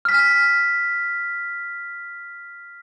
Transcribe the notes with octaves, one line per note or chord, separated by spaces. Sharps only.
F6 B6